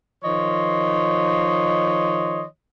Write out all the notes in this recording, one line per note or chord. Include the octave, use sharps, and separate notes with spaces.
D#3 F3 C#5 D#5 C6